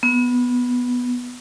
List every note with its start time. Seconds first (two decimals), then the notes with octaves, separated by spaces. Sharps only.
0.03 B3